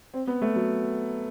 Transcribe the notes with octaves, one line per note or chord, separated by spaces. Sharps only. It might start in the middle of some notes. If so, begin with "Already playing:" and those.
C4
B3
A3
F#3